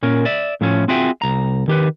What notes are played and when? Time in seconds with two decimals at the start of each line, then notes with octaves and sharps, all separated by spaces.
0.03 A#2 C#4 A#4
0.25 D5 E5
0.61 A2 F3 A3 C#4
0.88 C4 F4 F#4 G#4 E5 G5
1.22 C2 A#5
1.68 D#3 G4 B4